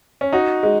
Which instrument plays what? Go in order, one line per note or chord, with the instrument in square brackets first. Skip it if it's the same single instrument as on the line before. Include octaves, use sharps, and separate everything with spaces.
[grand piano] C#4
[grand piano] D#4 [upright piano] F#4
[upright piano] G#3